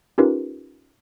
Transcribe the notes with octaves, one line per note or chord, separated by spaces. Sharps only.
C#4 D#4 F4 G4 A#4 B4